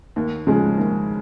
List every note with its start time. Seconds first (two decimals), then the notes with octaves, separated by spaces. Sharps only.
0.16 D#2
0.47 C#3 F3 G#3
0.78 D#2